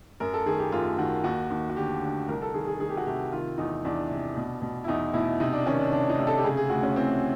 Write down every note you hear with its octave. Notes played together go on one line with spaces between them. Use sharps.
F#2 A#4
A4
D#3 G#4
G4
F#2 F4
D#3 F#4
D#2 F#4
D#2
F#4
D3 G4
D3
C2 A#4
A4
D#3 G#4
G#4
D#3 G#4
G4
F#4
C3 G4
D#3 F4
E2 D#4
E2 D4
C3
B2
B2
E4
E2 D#4
B2 E4
C3 D#4
D4
D#3 C#4
D4
C3 D4
D#4
C3
A4
G4
C#3 G#4
G#4
D2 F#4
C#4
E3 C4